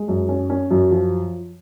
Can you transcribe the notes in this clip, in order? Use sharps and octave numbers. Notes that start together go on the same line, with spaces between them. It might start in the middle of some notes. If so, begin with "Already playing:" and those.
Already playing: G#3
F#2
C#4
C#4
F#2
F3